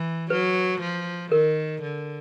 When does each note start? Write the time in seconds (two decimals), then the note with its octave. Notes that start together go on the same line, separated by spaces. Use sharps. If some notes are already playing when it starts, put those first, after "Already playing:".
Already playing: E3
0.30 F#3 B4
0.81 F3
1.32 D#3 A#4
1.82 D3